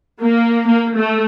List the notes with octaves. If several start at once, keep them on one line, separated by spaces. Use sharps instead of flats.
A#3
A#3
A3